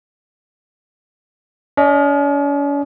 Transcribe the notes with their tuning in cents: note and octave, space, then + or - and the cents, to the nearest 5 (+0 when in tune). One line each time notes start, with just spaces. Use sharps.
C#4 +45 D#5 -15